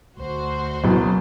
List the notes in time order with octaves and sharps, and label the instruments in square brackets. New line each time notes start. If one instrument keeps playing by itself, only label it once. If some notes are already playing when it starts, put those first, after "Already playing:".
[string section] D2 F#4 C5
[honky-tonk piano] F#1 B2 E3